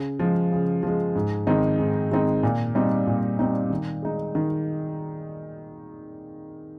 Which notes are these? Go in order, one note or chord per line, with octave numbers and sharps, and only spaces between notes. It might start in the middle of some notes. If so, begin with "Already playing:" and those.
Already playing: C#3
F3 G#3
C#3
F3 G#3
G#2
D#3 G#3 C4 D#4
G#2
D#3 G#3 C4 D#4
A#2
G3 C4 D#4
A#2
G3 C4 D#4
D#3
G#3 D#4
D#3